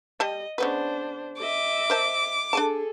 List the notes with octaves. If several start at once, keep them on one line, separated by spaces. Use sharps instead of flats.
G3 D#5 A5
C#3 B3 D4 B4 C5
D#5 E5 D6
A#4 C5 A5
D4 G#4 A4 G#5 A5